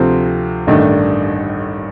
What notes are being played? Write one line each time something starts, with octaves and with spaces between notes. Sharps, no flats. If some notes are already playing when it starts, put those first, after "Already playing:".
Already playing: D2 C3 F3 C4
A1 G2 D#3 A3 D4